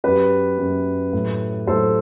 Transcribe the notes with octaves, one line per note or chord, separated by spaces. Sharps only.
F#2 F#3 G4 B4
F#2 F#3
A2 F#3
A2 F#3 A4 C5